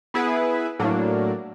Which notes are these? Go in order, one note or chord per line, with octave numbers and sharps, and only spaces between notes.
B3 E4 G#4 B4
A2 F#3 A#3 D4